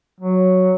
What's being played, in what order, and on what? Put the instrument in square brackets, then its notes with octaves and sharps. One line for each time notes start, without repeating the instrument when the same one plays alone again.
[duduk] F#3